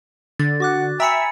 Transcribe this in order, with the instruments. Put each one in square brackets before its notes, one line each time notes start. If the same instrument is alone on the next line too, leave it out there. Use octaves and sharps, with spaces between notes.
[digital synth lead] D3 [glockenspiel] A6
[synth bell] F#4 D6 F#6 [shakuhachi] F#5
[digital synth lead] E5 [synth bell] G5 E6 [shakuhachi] G#5 [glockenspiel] A#5 B5 C#7